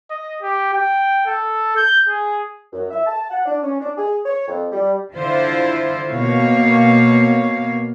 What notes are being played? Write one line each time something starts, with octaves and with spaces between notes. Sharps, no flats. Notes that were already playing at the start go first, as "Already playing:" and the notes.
D#5
G4
G5
A4
G6
G#4
F#2
E5
A5
F#5
D4
C#4
D4
G#4
C#5
F2
G3
D3 E4 F4 C5
B2 A#3 C#5 F5